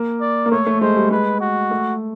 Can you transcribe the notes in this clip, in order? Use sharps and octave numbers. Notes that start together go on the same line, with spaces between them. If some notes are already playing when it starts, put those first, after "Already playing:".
Already playing: A#3
D5
A#3
A3 C#5
A3
G#3 C5
G3
G#3 B4
F#4
A3